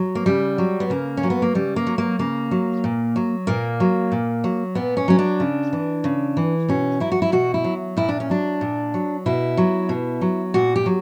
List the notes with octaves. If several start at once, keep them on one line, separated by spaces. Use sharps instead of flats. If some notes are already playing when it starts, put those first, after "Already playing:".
Already playing: F#3
A#3
C#3 G3
F#3
B3
C#3 A#3
C#4
F#3
B3
A#3
C#3 G3
A#3
F#3
A#3
C#3 A#3
F#3
A#2
F#3
A#2 A#3
F#3
A#2
F#3
A#2 B3
C#4
F#3 C#4
D4
C#3
E3
C#3
E3
B2 C#4
F#3 E4
F#4
E4
B2 F#4
E4
F#3
A#2 E4
D4
C#4
F#3 D4
A#2
F#3
B2 E4
F#3
B2
F#3
A#2 F#4
G4
F#3